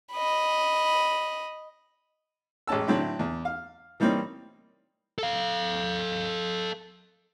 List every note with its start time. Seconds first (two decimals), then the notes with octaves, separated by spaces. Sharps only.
0.13 D#5 B5
2.67 A1 G#3 C#4 A5 E6
2.87 A2 D3 F#3 C4 E4
3.19 E2
3.45 F5
4.00 E3 G3 A#3 C4 C#4 D#4
5.18 A4 F5